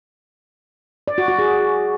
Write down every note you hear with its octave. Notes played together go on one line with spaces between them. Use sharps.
D5
F#4
F#4
G#4